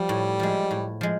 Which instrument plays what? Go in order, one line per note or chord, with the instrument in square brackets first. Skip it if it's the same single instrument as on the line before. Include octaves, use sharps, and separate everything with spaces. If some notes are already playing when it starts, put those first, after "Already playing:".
Already playing: [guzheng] F3 [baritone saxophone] G3
[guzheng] A2
F3 G#3
A2
F3 G#3